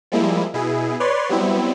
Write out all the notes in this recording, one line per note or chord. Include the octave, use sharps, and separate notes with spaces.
F3 G3 G#3 A#3 E4
B2 E4 G#4
B4 C#5 D5 C6
F#3 G3 B3 C4 E4